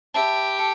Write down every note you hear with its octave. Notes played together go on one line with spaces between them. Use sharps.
G4 B4 E5 A5
A4